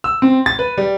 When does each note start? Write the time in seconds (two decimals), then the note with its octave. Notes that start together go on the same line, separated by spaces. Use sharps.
0.04 E6
0.22 C4
0.46 A6
0.59 B4
0.78 G3